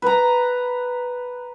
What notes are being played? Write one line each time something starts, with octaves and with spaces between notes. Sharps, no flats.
B4 A#5